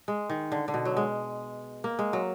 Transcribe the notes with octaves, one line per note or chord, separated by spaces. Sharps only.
G#3
D#3
D3
D3
B2
F#3
G#3
A#3
G#3
F#3